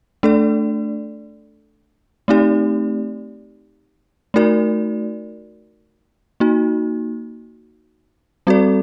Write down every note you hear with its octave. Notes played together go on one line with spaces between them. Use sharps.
A3 D4 A4 D5
A3 C4 D#4 G4 D5
A3 D#4 F#4 A#4 D5
A#3 D#4 F#4
G3 C4 F#4 A4 D5